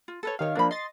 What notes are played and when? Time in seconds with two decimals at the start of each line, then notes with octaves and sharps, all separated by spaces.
0.08 F4
0.23 A4 B4 C#5
0.39 D#3 G4 C#5 F5
0.55 F3 A#3 D4 F4 B5
0.71 D#5 C6 D#6 A6